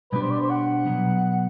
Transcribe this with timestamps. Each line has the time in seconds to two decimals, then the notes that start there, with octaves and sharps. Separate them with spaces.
0.12 B2 G3 B3 D4 G4 B4
0.22 C5
0.31 D5
0.41 C5
0.50 F#5
0.86 B2 F#3 B3